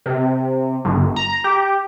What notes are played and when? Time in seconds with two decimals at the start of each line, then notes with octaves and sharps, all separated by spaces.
0.06 C3
0.85 G1
1.16 A#5
1.44 G4